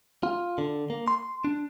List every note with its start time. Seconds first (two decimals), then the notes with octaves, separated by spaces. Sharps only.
0.23 F4
0.58 D3
0.90 A#3
1.08 C6
1.44 D4